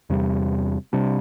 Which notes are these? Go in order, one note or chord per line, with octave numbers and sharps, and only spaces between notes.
E2 C3 G3
C3 G3 D4